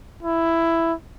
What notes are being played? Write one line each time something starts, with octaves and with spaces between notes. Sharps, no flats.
E4